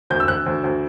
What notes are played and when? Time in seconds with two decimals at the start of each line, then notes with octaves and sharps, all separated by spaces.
0.10 D2 G6
0.20 E6
0.28 D2 F#6
0.46 D2
0.64 D2